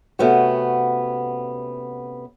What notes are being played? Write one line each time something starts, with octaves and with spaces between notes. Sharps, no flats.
C3 A3 B3 C#4 F#4